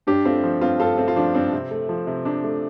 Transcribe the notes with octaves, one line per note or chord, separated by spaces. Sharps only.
G2 D4 G4
A3 C4 F4
F3
G2 C4 F4
G2 F4 A4
A3 C4 F4
F4
F3 D4
G2 C4
C3
A3
F3
C3
C3 D4
A3